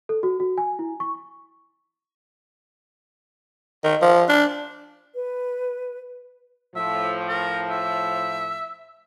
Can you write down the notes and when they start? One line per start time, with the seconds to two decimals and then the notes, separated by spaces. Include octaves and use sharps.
0.09 A4
0.23 F#4
0.40 F#4
0.58 G#5
0.79 E4
1.00 C#6
3.84 D#3
4.02 F3
4.29 D4
5.15 B4
6.76 A2 F3 E5
7.29 A#4
7.70 E5